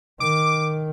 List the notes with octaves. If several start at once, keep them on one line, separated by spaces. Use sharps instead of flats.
D#3 D6